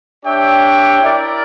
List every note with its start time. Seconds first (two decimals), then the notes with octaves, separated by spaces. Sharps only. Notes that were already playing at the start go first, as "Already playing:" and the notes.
0.23 D4 G4 C#5 E5 G5
1.01 E4 A#4 D5